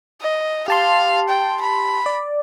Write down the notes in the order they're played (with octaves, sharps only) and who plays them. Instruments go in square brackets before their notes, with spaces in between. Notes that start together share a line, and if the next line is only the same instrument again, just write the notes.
[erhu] D#5
[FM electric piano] G4 A5 C6 [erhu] F5
[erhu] G5
B5
[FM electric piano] D5